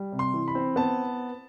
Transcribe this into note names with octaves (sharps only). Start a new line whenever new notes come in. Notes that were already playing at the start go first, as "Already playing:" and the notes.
Already playing: G3
C3
C6
E3
B5
C4
B3 A5